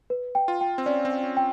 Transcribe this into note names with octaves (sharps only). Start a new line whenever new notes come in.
B4
G5
F4
G5
C4
C#4 D5
C4
G5
C#4
G5